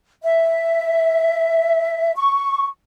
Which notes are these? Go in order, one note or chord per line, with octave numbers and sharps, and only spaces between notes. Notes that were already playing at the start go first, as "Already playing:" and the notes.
E5
C#6